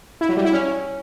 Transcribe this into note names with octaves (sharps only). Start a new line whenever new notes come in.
E4
F#3
G3
E4
C#4